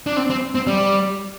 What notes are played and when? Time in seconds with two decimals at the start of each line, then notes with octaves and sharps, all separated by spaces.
0.07 D4
0.17 C4
0.30 C4
0.55 C4
0.67 G3